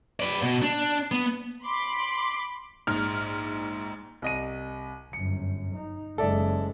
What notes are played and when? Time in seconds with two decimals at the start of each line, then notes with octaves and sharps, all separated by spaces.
0.20 B4 D5
0.43 B2
0.62 D4
1.12 B3
1.64 B5 C6 D6
2.87 A#1 G#2 F6
4.22 C2 D#5 D#7
5.13 G1 F#2 C#7
5.76 D#4
6.18 F#1 G#3 A4 D5 E5